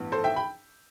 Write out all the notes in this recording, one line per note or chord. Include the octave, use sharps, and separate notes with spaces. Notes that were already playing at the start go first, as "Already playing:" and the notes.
Already playing: A1 G2 E3 B3
A4 C5
E5 G5
G5 B5